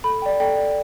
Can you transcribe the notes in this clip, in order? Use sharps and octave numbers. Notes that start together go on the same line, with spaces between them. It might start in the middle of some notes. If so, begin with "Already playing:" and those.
A4 B5
D5 G5
A4 G5
D5 G5